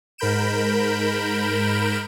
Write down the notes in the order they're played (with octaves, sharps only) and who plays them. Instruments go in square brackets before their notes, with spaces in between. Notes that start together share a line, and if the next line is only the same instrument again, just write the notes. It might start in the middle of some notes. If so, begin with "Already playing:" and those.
[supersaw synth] G#2 A#4 B5 G6 D7 E7